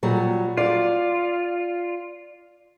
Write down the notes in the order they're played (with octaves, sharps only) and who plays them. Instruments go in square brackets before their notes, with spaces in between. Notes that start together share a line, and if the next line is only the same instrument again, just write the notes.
[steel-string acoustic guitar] A#2 F#3 G3
[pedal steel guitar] F4 [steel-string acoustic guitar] D5